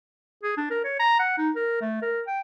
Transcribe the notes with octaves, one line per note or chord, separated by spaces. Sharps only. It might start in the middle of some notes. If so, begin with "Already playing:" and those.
G#4
D4
A#4
C#5
A#5
F#5
D#4
A#4
A3
A#4
G5